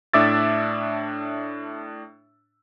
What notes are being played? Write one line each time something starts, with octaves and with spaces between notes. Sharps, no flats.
A2 D4 E5 D6 E6 A6